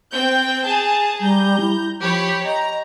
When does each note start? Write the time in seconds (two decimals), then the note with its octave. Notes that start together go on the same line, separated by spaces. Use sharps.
0.12 C4 G5 G6
0.66 G#4 A5
1.21 G3 A#5 G6
1.61 E4
2.01 F3 G4 C#5 B5
2.45 D#5 A#5